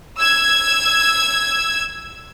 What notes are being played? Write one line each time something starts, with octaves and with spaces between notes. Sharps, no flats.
E6 G#6